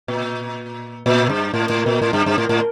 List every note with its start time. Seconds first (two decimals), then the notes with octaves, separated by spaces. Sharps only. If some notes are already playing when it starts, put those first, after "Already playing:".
0.08 A#2
1.06 A#2
1.30 G2
1.54 A2
1.70 A2
1.86 A#2
2.02 A2
2.13 G2
2.26 G2
2.38 A2
2.49 A2